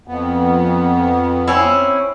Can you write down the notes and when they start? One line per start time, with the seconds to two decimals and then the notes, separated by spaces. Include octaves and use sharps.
0.08 F2 B3
1.48 C4 C#4 E4